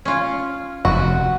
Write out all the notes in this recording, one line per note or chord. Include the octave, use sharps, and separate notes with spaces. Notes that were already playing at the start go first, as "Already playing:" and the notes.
C#4 F4
F1 D#2 F#4